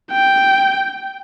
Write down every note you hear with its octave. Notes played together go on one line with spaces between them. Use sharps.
G5